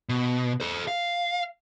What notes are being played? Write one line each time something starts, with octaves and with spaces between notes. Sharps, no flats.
B2
A4 C5
F5